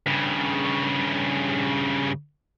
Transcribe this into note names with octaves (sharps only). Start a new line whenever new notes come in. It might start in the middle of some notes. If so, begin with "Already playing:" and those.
G2 C#3